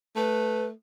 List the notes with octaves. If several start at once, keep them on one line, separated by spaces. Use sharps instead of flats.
A3 B4